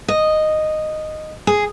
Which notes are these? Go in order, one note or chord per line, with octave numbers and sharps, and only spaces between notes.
D#5
G#4